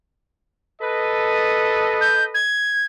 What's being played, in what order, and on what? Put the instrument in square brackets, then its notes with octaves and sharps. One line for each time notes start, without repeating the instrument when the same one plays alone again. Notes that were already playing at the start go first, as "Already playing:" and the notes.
[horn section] A4 B4 D#5
[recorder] G6
G#6